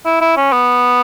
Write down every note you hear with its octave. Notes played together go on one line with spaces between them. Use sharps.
E4
E4
C#4
B3